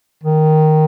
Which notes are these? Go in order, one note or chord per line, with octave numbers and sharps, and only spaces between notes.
D#3